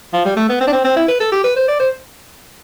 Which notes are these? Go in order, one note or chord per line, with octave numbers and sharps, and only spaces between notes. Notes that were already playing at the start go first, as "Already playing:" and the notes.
F3
G3
A3
B3
C4
D4
C4
C4
E4
B4
A4
G4
B4
C5
D5
C5